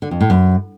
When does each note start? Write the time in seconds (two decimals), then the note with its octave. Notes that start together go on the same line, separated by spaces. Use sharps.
0.02 D3
0.11 F2
0.21 A2
0.30 F#2